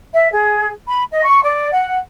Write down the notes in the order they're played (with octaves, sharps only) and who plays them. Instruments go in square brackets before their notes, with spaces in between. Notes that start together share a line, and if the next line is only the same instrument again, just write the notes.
[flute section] E5
G#4
B5
D#5
C#6
D5
F#5